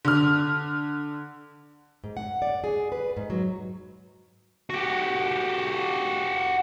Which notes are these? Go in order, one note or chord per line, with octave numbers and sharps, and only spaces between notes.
D3 F6
G#2
F#5
D5
G#4
B4
G#2
F#3
F#4 G4